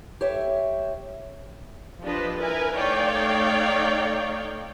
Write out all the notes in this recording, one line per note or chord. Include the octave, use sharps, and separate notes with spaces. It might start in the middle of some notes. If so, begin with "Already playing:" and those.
G4 C#5 E5
F3 D4 G4 B4 D#5
E4 A#4 B4 G#5
A3 D#4 C#5 D5 F5 G5